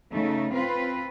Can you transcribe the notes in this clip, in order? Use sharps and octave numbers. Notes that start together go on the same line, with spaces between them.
C#3 A3 D#4
C4 F4 B4